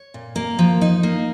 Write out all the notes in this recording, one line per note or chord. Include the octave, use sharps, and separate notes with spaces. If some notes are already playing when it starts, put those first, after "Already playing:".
Already playing: C#5
A#2
A#3
F3
D#4
A#3